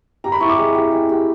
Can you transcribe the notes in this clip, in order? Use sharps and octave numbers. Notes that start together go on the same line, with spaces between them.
G4 A#5
B5
E4 C#6
D6
G#3
G4
G#3
G4